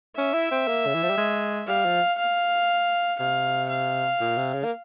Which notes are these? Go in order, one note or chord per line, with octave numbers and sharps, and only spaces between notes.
C#4 E5
E4
C4
A#3
C#3
E3
F3
G3
G#3
G3 F5
F3
F5
C3 F5
F5
A#2
C3
C#3
A#3